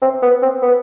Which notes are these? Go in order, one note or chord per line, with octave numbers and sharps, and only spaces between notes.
C4
B3
C4
B3